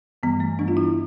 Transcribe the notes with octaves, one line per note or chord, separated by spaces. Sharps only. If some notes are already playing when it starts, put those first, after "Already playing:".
G2 E3 G3 B3
A3
G2 E3 G3 D4
F4
E4